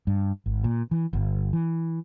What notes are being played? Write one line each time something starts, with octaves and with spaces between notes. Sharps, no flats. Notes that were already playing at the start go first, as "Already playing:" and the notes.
G2
G#1
A#2
E3
G1
E3